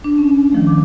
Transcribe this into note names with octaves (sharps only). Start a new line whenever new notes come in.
D4
C#4
D#3 F3 A3
D6